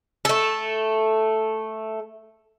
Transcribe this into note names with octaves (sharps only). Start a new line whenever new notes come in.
A3 A4